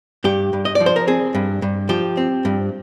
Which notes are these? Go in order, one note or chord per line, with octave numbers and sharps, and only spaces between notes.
G2 G4
G2
D#5
D5
F3
C5
A#4
C4 G#4
G2
G2
F3 G4
C4
G2